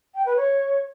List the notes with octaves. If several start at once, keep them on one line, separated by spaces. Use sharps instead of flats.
G5
B4
C#5